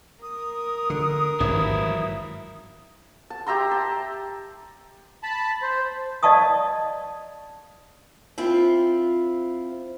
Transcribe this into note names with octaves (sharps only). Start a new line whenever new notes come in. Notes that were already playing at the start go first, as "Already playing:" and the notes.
A#4 D#6
D3
G#1 G2 E3 F#3 E4
A5
G4 E5 A#5 C6
A5
A5 B5
C5
D5 D#5 F5 A5 C#6 D#6
C4 E4 F4